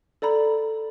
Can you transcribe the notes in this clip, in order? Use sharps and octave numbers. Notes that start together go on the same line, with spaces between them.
A4 D5 A#5 B5